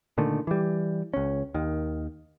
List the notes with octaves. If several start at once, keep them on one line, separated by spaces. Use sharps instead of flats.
A#2 D3 D#3 A3
E3 G3
C#2 C#4
D#2 D#3